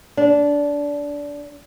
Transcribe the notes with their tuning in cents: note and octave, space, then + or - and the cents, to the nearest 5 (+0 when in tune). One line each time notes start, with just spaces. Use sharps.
D4 -20